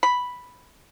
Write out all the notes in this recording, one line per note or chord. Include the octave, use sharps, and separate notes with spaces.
B5